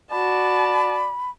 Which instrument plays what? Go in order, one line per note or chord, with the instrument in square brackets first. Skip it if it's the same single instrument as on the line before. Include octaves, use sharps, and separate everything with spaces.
[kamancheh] F#4 A5 [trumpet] D5 [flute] B5